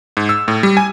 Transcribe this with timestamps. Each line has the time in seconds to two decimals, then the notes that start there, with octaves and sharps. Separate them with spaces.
0.17 G#2
0.29 E6
0.48 A2
0.63 G3
0.77 G#5